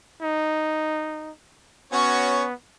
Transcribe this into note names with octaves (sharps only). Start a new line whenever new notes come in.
D#4
B3 C#4 F#4 C#5